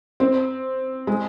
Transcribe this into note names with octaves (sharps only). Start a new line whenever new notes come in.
C4
G#3